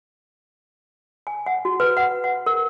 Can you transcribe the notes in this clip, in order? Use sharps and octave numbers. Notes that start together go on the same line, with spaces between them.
G#5
F#5
F#4
B4
F#5
F#5
A#4